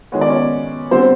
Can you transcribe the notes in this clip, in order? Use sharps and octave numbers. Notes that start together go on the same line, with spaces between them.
D#3 G#3 B3 C#5
D5
C#4 C#5
D3 G3 B3 C4 C5